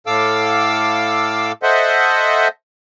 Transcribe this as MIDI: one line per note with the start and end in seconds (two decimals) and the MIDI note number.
0.07 1.52 45
0.07 1.52 69
0.07 1.52 77
0.07 1.52 86
0.07 1.52 88
1.63 2.48 69
1.63 2.48 72
1.63 2.48 75
1.63 2.48 76
1.63 2.48 78